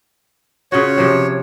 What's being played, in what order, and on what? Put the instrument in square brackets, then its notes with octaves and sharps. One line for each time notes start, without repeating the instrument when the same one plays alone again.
[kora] C#3 F4 F#4 [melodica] C#5
[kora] C3 F3 C4